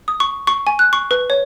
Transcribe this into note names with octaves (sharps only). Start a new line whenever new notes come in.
D#6
C#6
C#6
G#5
F#6
C#6
B4
C#5